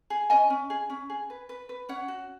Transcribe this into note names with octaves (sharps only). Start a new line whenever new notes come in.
G#4
C#4 D#5 G#5
C#4
G#4
C#4
G#4
B4
B4
B4
C#4 C#5 F#5
F#4